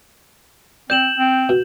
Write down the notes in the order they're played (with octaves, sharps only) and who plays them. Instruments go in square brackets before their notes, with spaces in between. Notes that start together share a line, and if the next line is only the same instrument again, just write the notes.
[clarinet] C4 [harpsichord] D5 [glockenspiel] G6 E7 F#7
[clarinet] C4
[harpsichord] B2